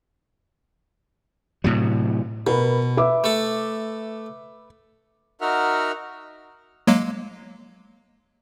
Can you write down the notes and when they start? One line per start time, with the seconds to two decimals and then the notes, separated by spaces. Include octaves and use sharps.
1.64 A2 C3 F#3
2.47 B2 A#4 B4
2.97 B4 E5 D6
3.24 A3 A4
5.41 D#4 F#4 A#4 E5 F#5 F6
6.87 F#3 G#3 A#3